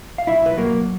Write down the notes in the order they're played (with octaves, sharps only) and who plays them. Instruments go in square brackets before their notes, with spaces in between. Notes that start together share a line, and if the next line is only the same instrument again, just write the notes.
[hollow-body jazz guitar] F5
B1 E4 E5
B4
F#3 A#3 A#4